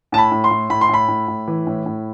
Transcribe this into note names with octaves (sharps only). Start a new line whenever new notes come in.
A2 A5
B5
A2
C6
A2
A2 B5
C6
A2 B5
A2
A2
E3
A2
A2